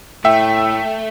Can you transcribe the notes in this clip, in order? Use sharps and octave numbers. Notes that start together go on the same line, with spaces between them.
A2 A3 E5 G5